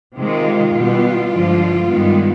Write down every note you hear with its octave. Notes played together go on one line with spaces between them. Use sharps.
C3 D#3 G#3 F4
B2 G3 B3
G2 D3 F3 G#3
G2 D#3 G#3 B3